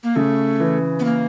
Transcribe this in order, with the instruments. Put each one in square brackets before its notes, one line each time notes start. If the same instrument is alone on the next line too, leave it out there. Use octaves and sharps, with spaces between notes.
[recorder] A#3
[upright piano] C#3 [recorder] A3
[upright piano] E3
[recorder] B3
A#3